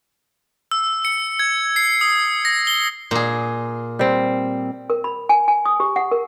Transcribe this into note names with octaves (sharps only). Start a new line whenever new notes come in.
E6
C#7
G#6
C7
D#6
A#6
G7
A#2 G#4
G3 C4
A#4
B5
G#5
G#5
D#6
G4
F#5
A#4